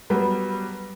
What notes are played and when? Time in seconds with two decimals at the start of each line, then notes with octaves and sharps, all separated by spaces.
0.10 F#3 G3 B3